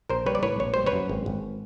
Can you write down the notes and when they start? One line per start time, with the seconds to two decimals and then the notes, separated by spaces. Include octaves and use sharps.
0.10 A#1 A#4 C5
0.26 G3 B4 C#5
0.35 D5
0.43 A2 B4 C#5
0.60 A#1 C#5
0.74 G3 C5
0.86 B4 C#5
0.92 F#2
1.09 G#1
1.26 G#1